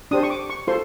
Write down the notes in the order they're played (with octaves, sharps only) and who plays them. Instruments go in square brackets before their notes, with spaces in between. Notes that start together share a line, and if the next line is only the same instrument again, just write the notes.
[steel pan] D4 G4 C5 D#6
C#6
D6
C#6
F4 A4 C5 C6